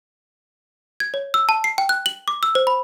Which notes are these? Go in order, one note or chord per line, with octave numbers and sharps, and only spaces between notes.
G#6
C#5
E6
A5
C7
G5
F#6
F#7
D6
E6
C5
B5